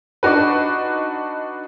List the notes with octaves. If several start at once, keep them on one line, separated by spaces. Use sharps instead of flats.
D4 D#4 F#4 B4